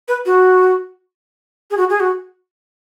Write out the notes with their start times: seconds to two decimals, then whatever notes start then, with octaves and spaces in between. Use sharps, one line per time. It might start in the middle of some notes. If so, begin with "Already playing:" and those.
0.08 B4
0.26 F#4
1.71 G#4
1.77 F#4
1.90 G#4
2.00 F#4